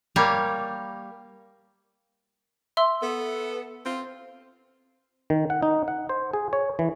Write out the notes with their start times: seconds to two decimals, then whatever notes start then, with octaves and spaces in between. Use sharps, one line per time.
0.16 G3 A#3 C#5 F5
2.77 E5 C6 E6
3.02 B3 A4
3.86 C4 F4
5.30 D#3
5.50 F#5
5.63 D#4
5.88 F#5
6.09 C5
6.33 G#4
6.53 C#5
6.79 E3